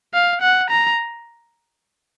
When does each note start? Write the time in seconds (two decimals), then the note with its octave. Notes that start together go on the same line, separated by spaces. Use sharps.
0.14 F5
0.42 F#5
0.70 A#5